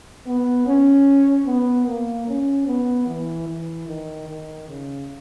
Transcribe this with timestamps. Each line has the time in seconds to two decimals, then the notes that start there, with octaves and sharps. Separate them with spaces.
0.27 B3
0.66 C#4
1.46 B3
1.87 A#3
2.27 C#4
2.67 B3
3.08 E3
3.48 E3
3.87 D#3
4.29 D#3
4.67 C#3